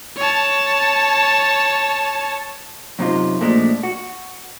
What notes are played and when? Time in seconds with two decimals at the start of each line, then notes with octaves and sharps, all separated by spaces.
0.17 C#5 A5
2.99 F#2 C3 D#4 F4
3.41 F2 A#2 F3 G#3 A3 D4
3.83 F#4